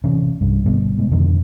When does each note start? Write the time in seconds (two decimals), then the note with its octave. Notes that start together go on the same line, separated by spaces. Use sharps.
0.04 A1 C3 E3 C#4
0.41 C2 G2
0.64 G1 B2 G3
0.98 G#2 B2
1.11 F2 B2 D3 D#3